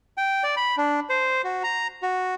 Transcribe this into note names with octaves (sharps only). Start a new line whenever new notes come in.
G5
D5
B5
D4
C5
F#4
A#5
F#4